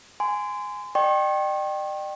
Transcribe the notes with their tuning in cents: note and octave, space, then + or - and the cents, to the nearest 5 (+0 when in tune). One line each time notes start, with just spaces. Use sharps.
G#5 +0 C6 -30
D5 +45 G5 -10 C#6 -45